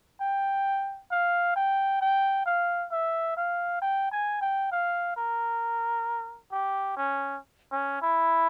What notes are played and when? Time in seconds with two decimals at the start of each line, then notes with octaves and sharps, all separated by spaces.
0.21 G5
1.11 F5
1.56 G5
2.01 G5
2.46 F5
2.92 E5
3.37 F5
3.82 G5
4.11 G#5
4.41 G5
4.72 F5
5.17 A#4
6.52 G4
6.97 C#4
7.72 C#4
8.02 E4